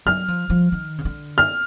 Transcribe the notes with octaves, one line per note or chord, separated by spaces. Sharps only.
F#3 F6
F3
F3
D#3
C#3
D3
F6